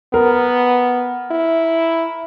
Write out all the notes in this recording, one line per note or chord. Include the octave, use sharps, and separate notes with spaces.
B3 A#4
E4